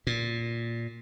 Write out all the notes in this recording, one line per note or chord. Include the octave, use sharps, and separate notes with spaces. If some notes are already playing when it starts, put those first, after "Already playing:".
A#2